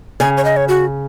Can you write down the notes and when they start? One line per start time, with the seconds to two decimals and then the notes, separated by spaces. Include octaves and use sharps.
0.20 C#3 G#5
0.37 C#5
0.45 D#5
0.57 C#5
0.68 F#4